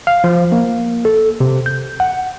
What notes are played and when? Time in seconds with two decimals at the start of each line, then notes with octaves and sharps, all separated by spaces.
0.07 F5
0.24 F3
0.52 A#3
1.05 A4
1.40 C3
1.66 G6
2.00 F#5